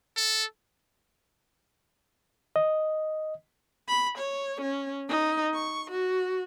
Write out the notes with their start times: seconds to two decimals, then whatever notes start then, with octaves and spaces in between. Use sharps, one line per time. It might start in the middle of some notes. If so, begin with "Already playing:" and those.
0.17 A4
2.56 D#5
3.88 B5
4.18 C#5
4.61 C#4
5.08 D#4
5.54 C#6
5.90 F#4